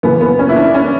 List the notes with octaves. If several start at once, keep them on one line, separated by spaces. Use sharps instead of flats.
F#2 C#3 E3 B3
B3
C#4
E4
D4
C#4